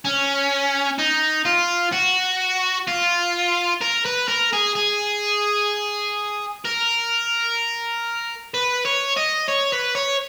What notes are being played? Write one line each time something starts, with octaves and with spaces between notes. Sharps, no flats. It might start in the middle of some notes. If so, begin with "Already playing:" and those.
C#4
D#4
F4
F#4
F4
A#4
B4
A#4
G#4
G#4
A#4
B4
C#5
D#5
C#5
B4
C#5